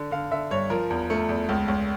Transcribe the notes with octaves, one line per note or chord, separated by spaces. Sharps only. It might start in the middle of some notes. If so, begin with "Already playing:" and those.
Already playing: D3
D3 F5
D3 E5
G2 C#5
F3 A#4
E2
A3
E2
C#2
C#2